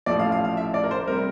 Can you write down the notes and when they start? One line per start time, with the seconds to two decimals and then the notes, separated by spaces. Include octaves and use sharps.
0.06 A1 A2 F3 D5
0.19 F5
0.32 F5
0.45 F5
0.57 E5
0.74 D5
0.83 A#4
0.91 C5
1.07 C3 G3 A#4